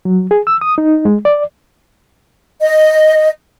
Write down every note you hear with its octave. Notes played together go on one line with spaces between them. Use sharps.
F#3
G#4
E6
D#6
D#4
G#3
D5
D#5